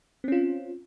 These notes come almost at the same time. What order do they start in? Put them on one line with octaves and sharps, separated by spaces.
C4 C#4 F4